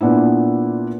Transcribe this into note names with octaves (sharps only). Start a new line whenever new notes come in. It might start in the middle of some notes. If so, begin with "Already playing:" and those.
A#2 B3 D4 E4